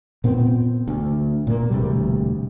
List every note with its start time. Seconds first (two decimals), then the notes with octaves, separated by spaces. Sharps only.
0.24 A#2 B3 C4
0.88 D2
1.47 A#2 A#3
1.70 E1 D2 C3 G3